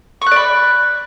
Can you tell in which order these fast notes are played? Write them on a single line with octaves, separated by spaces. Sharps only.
C#6 F#6 D5 B5